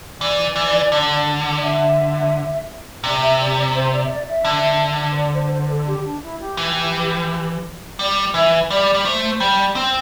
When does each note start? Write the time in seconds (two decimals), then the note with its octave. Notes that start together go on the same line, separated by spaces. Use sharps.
0.20 E3 D5
0.56 E3
0.92 D3
1.57 D5
1.62 E5
3.03 C3 D5
3.21 E5
3.39 D5
3.56 D5
3.74 C5
3.92 D5
4.04 E5
4.10 D5
4.27 E5
4.45 D3
5.11 C5
5.16 D5
5.34 C5
5.52 C5
5.65 C5
5.69 A4
5.87 G4
6.04 D4
6.22 E4
6.39 G4
6.57 E3
7.99 G3 D5
8.34 E3 E5
8.70 G3 D5
8.94 G3
9.05 A3 C5
9.32 C5
9.40 G3 D5
9.59 D5
9.76 C4